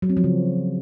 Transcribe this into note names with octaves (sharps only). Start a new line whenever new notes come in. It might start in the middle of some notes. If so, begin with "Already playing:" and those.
F#3
C4
F3
C#3